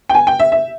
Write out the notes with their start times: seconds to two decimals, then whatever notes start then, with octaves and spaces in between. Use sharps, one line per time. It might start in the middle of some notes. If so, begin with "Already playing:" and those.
0.09 G5
0.14 G#5
0.27 G5
0.39 E5
0.52 E5